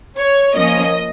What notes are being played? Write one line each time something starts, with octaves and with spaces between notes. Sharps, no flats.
C#5
F3 A#3 C#4 D#5